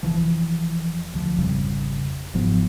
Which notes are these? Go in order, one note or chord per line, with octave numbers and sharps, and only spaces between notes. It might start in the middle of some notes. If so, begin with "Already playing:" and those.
F1 C#2 E3 F3
D2 F3
G#1 F2 C#3 G3
F#1 G#2 F3 B3